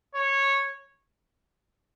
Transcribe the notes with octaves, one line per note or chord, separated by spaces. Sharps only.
C#5